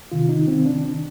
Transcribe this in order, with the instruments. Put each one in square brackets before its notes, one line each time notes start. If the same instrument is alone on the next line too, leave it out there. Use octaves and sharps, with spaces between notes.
[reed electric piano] C3 D#3 F4
D#4
C4
D4